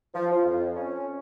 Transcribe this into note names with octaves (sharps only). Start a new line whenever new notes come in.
F3
F4
F2
C#4